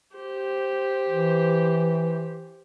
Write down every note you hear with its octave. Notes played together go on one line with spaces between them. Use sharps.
G4 C5
E3